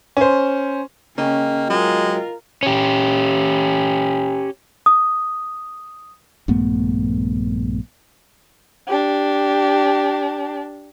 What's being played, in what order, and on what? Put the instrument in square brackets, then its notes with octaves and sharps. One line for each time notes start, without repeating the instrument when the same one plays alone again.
[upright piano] C#4 C5
[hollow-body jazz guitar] C#3 [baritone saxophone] A#3 [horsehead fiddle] C#4 [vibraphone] D#5 G5
[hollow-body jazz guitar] F#3 [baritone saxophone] G#3 [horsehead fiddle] F4 A#4
[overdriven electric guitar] C#4 G4
[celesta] D#6
[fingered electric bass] A#1 G2 A3 B3
[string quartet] D4 G4